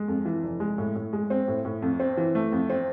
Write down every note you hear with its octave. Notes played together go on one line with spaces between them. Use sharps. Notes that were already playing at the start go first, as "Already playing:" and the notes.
Already playing: G#3
F2
E3
F1
G#3
A2
A2
G#3
C4
A2
A2
F2
C4
E3
A3
F2
C4